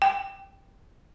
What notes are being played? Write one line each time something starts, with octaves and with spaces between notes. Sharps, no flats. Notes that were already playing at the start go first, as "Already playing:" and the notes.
G5